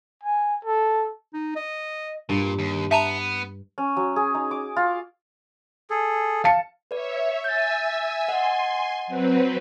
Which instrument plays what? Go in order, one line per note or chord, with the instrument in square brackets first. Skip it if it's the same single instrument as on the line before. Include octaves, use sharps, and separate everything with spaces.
[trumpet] G#5
A4
[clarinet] D#4
D#5
[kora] G2 [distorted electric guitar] A#2
[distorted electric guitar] D#2
[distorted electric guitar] B3 [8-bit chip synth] E5 A5 A#5
[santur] C#4
F#3
G#4
D#4
D6
F4
[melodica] G#4 A4
[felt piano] F5 A5 C#7
[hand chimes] B4 D5 [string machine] C#5 E5
[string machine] E5 G#5 E6 [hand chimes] G6 A6
[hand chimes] D#5 F#5 [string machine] G#5 C6
[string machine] F#3 C4 B4